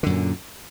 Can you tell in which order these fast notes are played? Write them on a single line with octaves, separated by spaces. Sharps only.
D3 F#2 A#2